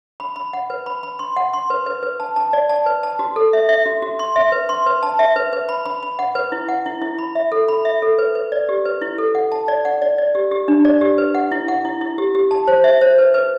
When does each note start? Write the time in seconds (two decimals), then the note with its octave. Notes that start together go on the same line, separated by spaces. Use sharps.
0.20 B5
0.36 B5
0.53 F#5
0.70 B4
0.86 B5
1.03 B5
1.19 C6
1.36 F#5
1.53 C6
1.70 B4
1.86 B4
2.03 B4
2.20 A5
2.36 A5
2.53 D5
2.69 A5
2.86 B4
3.03 A5
3.19 F#4
3.36 A4
3.53 E5
3.69 E5
3.86 F#4
4.02 F#4
4.19 C6
4.36 E5
4.52 B4
4.69 C6
4.86 B4
5.03 A5
5.19 E5
5.36 B4
5.53 B4
5.69 B5
5.86 B5
6.03 B5
6.19 F#5
6.35 B4
6.52 E4
6.68 F#5
6.86 E4
7.02 E4
7.18 B5
7.35 E5
7.52 A4
7.68 B5
7.85 E5
8.02 A4
8.18 B4
8.35 B4
8.52 D5
8.69 G4
8.85 B4
9.01 E4
9.18 A4
9.35 F#5
9.52 A5
9.68 D5
9.85 F#5
10.02 D5
10.18 D5
10.35 G4
10.51 G4
10.68 D4
10.85 D5
11.01 G4
11.18 B4
11.35 F#5
11.52 E4
11.68 F#5
11.85 E4
12.01 E4
12.18 G4
12.35 G4
12.51 A5
12.68 C5
12.84 E5
13.01 C5
13.18 B4
13.34 B4